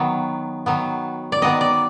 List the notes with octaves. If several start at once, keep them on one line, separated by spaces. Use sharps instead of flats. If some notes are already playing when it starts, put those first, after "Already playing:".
Already playing: D#3 F#3 B3
D#3 F#3 B3
D5
D#3 F#3 B3 D#5
D5